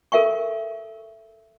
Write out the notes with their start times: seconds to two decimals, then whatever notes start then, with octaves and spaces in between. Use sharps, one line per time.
0.12 A4 A#4 E5 G5 C#6